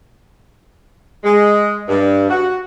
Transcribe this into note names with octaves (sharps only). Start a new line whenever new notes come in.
G#3
G2
F#4